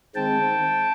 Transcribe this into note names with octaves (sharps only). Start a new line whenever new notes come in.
D#3 G#3 C4 G5 A5